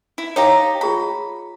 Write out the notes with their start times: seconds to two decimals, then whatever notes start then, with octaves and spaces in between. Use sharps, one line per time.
0.18 E4
0.36 D#4 G4 C#5 F5 A#5
0.81 F4 G#4 A#5 B5